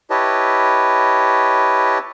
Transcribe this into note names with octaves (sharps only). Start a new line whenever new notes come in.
E4 G4 B4 C#5 D#5 A5